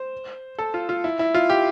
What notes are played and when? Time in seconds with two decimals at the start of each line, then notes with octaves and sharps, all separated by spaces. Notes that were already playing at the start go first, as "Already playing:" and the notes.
Already playing: C5
0.59 A4
0.74 F4
0.89 F4
1.04 E4
1.19 E4
1.34 F4
1.50 G4